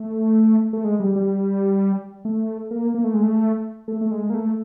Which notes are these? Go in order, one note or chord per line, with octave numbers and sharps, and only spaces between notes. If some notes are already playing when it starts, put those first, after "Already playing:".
Already playing: A3
A3
G#3
G3
G3
A3
A#3
A#3
A3
G#3
A3
A3
A3
G#3
A#3
A3